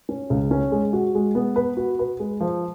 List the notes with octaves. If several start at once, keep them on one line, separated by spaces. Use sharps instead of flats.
C#4
C#2
C#4
G#3
F#4
G#3
B3
B4
F#4
B4
G#3
F3